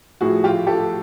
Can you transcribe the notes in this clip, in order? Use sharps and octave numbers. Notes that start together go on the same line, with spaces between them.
A2 F3 A3 F#4 G#4
F4 G4
G4 A4